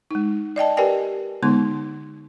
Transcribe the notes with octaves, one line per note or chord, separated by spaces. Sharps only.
G#3 D#4
D5 D#5 G5 A5
G4 A#4 B4 D5 G5 G#5
D3 G#3 B3 D#4 C6